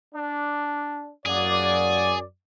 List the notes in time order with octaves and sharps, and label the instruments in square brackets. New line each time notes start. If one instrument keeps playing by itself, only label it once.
[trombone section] D4
[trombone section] A1 A#3 F#4 [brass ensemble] F#2 D5 [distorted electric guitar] G#4